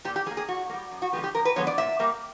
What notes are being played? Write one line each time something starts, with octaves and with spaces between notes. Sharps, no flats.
A#2 G4
G4
G3 G#4
A#3
G#4
A#2 F#4
A#3
G3
F#2
F#4
D3 F3 G#3 B3 G4
G4
F#2 A#4
B4
D3 F3 G#3 B3 C#5
D5
A#2 E5
G3 A#3